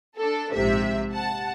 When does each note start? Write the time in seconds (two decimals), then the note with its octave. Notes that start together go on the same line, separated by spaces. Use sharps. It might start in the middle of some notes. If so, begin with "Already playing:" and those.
0.17 D4 A4
0.54 A#1 G#2 C3 E5
1.12 F#5 A5